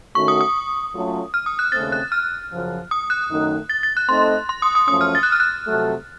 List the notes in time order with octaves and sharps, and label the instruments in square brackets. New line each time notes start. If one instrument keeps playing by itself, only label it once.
[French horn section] D#3 A3 C#4 F#4 [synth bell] C#6
[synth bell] D#6
D#6
[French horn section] F#3 A3 C#4 F4 A4
[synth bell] F6
D#6
F#6
[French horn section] D#2 C#3 A3 C4 [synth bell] A6
[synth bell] F#6
F6
[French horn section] F#2 C#3 F3
[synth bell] D#6
F#6
[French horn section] F#2 D#3 A3 D#4
[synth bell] A6
A6
F#6
[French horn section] A3 C4 D#4 A4 D#5 [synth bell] C6
[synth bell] C6
D#6
D#6
[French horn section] F#2 F3 A3 C#4 [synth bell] D#6
[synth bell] F6
A6
F#6
F6
F#6
[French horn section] F2 C3 F#3 A3